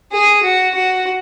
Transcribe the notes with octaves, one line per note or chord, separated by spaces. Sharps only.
G#4
F#4
F#4